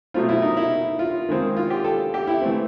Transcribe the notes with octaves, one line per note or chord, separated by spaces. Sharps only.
B2 F#3 A3 C4 F4
E4
D#4
E4
F4
D#3 G#3 C4
F4
G4
A4
G4
E4
E3 A3 C4